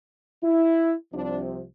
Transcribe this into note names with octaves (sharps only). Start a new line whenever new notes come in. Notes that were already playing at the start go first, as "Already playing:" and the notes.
E4
C2 C3 F3 D4